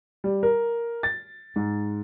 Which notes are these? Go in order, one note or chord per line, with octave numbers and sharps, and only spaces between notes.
G3
A#4
A6
G#2